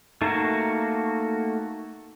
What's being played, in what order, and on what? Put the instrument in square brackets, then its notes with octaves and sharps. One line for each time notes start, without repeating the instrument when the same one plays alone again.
[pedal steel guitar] A3 A#3 F#4 [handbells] D#4